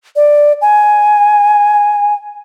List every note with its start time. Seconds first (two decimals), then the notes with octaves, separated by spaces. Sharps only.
0.16 D5
0.61 G#5